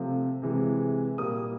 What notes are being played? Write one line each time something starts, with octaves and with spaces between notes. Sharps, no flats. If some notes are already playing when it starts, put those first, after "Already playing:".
Already playing: C3 F3 A3
C3 E3 G#3
A#2 G3 A#3 D#6